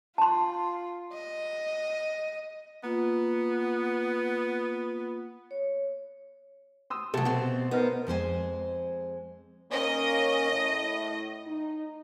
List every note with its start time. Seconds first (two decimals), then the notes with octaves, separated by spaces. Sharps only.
0.18 F4 A5 C6
1.13 D#5
2.83 A#3 B3 F4
5.51 C#5
6.90 C6 D#6 E6
7.14 C3 F#3 A3 G4 A4
7.25 B2 C4
7.71 B3 D#4 A#4 C5
8.07 F2 G#3 C5 G#5
9.72 D#3 A#3 C#4 D#5
10.52 A2
11.47 D#4